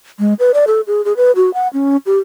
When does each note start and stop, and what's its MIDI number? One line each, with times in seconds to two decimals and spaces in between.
0.19 0.34 56
0.39 0.52 71
0.54 0.65 74
0.67 0.81 69
0.87 1.04 68
1.05 1.13 68
1.17 1.32 71
1.36 1.53 66
1.54 1.68 78
1.73 1.97 61
2.06 2.19 67